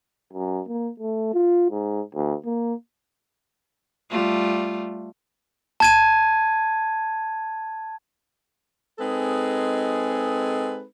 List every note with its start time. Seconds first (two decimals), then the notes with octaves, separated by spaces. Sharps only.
0.33 F#2
0.68 A#3
1.00 A3
1.34 F4
1.71 G#2
2.15 D2
2.45 A#3
4.10 G3 A3 F4
5.80 A5 G#6 D#7
8.99 G#3 C4 D#4 G#4 A4 B4